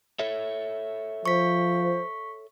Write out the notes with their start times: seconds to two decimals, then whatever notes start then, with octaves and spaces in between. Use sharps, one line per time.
0.19 A4 C#5 E5
1.26 F3 C5 C#6 B6